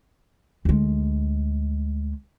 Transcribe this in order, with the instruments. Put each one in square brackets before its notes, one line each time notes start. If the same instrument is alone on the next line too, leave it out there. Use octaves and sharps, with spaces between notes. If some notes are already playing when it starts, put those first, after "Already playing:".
[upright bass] D2 G#3